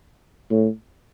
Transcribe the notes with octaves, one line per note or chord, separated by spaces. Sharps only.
A2